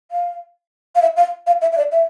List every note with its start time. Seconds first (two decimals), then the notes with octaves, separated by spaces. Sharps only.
0.11 F5
0.95 F5
1.02 E5
1.17 F5
1.47 F5
1.62 E5
1.72 E5
1.78 D5
1.92 E5